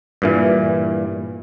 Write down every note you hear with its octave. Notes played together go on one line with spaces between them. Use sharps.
G2 A#2 E3